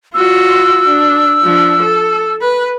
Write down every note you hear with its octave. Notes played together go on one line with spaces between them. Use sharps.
F4 F#4 E6
D4
F3 D4
A4
B4